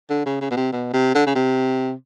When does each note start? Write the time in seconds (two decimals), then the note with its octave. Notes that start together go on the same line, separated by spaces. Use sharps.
0.10 D3
0.26 C#3
0.41 C#3
0.51 B2
0.57 C3
0.73 B2
0.93 C3
1.15 D3
1.27 C#3
1.35 C3